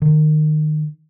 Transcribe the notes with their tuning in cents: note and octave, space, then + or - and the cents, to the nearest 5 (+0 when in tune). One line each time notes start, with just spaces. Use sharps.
D#3 -25